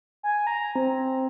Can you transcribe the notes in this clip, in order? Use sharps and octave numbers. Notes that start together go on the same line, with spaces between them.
G#5
A#5
C4